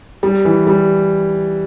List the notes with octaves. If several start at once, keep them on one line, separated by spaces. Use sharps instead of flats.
G3
E3
G3